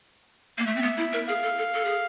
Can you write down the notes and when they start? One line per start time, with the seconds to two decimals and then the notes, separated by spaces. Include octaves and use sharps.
0.58 A#3
0.66 A3 E5
0.76 C4
0.82 B3
0.97 E4
1.13 A#4
1.28 G#4 F5
1.43 A4
1.58 A4
1.74 A4
1.85 G#4